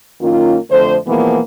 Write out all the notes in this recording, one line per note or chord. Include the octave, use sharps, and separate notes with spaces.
F#2 D#3 A#3 C#4 F4
F2 D3 F3 A3 C5
B2 E3 F3 G#3 A#3 B3